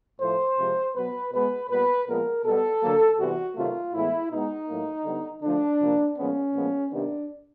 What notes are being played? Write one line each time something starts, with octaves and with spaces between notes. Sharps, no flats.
A2 F3 A3 C5
C3 F3 G#3
B2 F#3 B3 B4
B2 G#3 B3 B4
A#2 G3 B3 B4
A#2 F3 G#3 B3 A#4
B2 G3 B3 A4
D3 F#3 A#3
C3 E3 G3 B3 F#4
C3 D#3 F#3 A3 F4
A2 E3 G#3 B3 E4
B2 G#3 B3 D#4
A2 F#3 A#3
D3 G3 B3
D3 F3 A3 D4
C3 F3 A#3
A#2 F3 G#3 B3 C#4
A#2 F3 G#3 B3
C3 D#3 G3 B3 D4